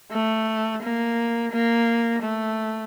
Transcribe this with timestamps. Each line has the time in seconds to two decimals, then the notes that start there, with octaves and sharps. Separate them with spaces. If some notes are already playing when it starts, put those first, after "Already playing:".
0.12 A3
0.82 A#3
1.53 A#3
2.24 A3